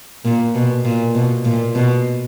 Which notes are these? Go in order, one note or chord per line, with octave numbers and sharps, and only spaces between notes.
A#2
B2
A#2
B2
A#2
B2